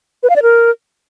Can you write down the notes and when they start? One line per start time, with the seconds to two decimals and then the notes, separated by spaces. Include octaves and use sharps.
0.23 B4
0.29 F5
0.36 D5
0.42 A#4